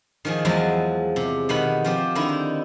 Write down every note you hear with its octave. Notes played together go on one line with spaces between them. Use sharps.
D#3 F3 G#4
E2 F3 F#3 G#3
C3
B2 D#3 F#5 B5
F3 C4 G4
D3 D#3 D#4 E4